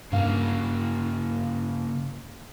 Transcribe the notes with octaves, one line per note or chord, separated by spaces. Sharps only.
G2 C#3 A#3 F5